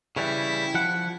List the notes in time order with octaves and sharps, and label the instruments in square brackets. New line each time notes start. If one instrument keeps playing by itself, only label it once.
[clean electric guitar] C#3 E3 G3 [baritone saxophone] E4
[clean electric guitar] F3 F#5